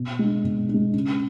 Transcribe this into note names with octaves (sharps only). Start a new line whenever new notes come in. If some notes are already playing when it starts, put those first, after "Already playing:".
Already playing: B2
G#3 D4
B2
D4
G#3
C#3